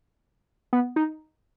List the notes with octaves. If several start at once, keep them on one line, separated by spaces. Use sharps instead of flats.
B3
D#4